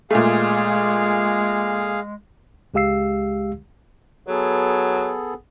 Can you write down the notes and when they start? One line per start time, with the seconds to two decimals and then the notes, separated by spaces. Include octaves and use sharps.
0.11 A#2 G#3 A3 G#4 F5
2.74 C#2 G#3 G4 F5 E6 C7
4.28 F#3 B3 G#4 A4